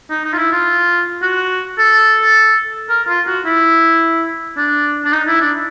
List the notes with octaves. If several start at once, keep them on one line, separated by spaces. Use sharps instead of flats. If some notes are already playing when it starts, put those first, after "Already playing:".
D#4
D#4
F4
E4
F4
F#4
A4
A#4
F4
F#4
E4
D4
D4
D#4
E4
D4